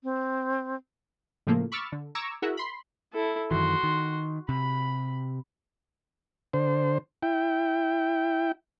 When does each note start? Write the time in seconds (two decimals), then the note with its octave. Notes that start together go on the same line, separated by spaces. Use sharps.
0.03 C4
1.47 A2 C#3 F3 A3 A#3
1.72 B5 C#6 D6 E6 F6 A6
1.92 D3
2.15 A#5 C#6 D6 E6 G#6
2.42 E4 F#4 G#4 A#4 E5 F#5
2.57 B5 C6
3.13 E4 A4
3.51 F#2 D#3 E3 F#4 C6
3.83 D#3
4.49 C3 B5
6.53 D3 C5
7.22 E4 G5